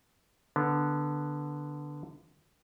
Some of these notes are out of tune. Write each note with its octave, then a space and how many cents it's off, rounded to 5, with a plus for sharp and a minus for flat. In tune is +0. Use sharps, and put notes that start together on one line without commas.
D3 +0 B3 -5